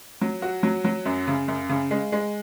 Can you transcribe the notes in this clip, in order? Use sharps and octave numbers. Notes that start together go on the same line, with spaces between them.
F#3
F#4
F#3
F#3
F#2
C#3
F#2
C#3
G#3
G#3